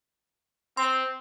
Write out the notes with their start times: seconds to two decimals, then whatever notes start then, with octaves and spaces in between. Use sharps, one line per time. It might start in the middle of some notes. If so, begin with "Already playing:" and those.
0.77 C4 C6